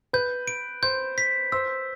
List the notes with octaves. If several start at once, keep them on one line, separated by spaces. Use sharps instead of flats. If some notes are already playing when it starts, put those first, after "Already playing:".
B4 G6
D7
C5 G6
B6
C5 E6